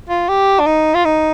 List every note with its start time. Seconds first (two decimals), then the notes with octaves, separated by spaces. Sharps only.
0.09 F4
0.29 G4
0.60 D4
0.66 D#4
0.94 F4
1.05 D#4